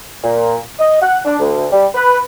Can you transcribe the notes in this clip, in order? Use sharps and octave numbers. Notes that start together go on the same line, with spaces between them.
A#2
D#5
F#5
D4
D2
G3
B4